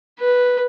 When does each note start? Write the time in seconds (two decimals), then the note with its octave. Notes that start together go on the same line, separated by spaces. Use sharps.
0.19 B4